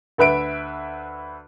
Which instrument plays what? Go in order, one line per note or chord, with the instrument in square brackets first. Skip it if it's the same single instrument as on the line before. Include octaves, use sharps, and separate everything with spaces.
[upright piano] D2 B4 E5 D7